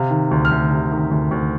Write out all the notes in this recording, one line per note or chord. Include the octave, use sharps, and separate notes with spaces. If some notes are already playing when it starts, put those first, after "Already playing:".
Already playing: C3 F5
D#3
D2
F6
D2
C3
D#3
D2
D2